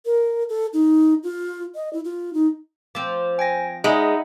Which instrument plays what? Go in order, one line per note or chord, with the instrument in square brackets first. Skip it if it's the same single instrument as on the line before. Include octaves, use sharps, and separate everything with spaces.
[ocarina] A#4
A4
D#4
F4
D#5
E4
F4
D#4
[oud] F3 C4 [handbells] D6
[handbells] G5 A#6 [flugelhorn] G#5
[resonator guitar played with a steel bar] G#3 [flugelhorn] D#4 [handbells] E5 F#5 B5